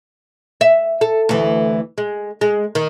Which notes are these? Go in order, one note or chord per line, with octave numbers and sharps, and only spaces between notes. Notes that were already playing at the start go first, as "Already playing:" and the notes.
E5
A4
D2 E3
G#3
G#3
D#3